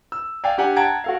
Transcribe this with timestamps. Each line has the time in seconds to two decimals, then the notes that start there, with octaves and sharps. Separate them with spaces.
0.12 E6
0.44 D5 F5 G5 G#5
0.58 D4 G4 F#5 G#5
0.76 F#5 G5 A5 A#5 G#6 D7
1.04 F#4 A4 F5